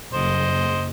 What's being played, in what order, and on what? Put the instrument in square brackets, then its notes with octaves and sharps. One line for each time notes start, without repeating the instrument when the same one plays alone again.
[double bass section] F#1 [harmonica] C5 D#5